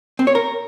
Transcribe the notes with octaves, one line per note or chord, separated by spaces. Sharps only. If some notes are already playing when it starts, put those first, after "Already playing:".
C4
C#5
A#4